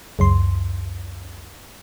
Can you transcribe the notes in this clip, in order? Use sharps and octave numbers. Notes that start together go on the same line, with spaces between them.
C#2 F#2 C6